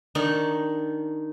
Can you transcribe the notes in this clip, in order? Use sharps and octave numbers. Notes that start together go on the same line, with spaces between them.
D#3 D4 D#4 C#6